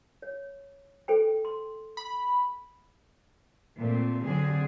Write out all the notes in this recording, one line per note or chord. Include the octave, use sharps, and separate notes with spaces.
C#5
A4 C5 G5
C6
B5
A#2 A3 C4
D3 F#3 C4 G#4